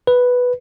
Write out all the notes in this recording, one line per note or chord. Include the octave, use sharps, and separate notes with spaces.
B4